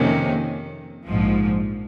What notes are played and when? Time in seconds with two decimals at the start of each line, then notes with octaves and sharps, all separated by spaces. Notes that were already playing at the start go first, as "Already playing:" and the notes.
Already playing: F2 C3 D#3 A#3 C#4
1.06 A#1 G#2 F3